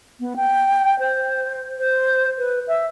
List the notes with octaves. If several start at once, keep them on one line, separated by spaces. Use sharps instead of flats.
B3
G5
C5
C5
B4
E5